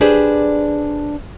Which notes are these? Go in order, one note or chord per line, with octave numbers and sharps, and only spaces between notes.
D4 G4 G#4 B4 C5 D5